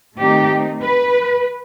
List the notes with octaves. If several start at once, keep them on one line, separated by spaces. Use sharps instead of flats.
D#3 A3 C4 D#4 G4
B4